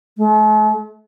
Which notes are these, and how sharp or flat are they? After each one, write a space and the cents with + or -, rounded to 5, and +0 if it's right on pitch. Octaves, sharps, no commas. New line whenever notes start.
A3 -45